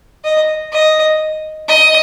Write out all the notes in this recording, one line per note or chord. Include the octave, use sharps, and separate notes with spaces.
D#5
D#5
D#5